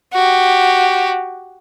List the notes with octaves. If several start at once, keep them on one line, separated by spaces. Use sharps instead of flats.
F#4 G4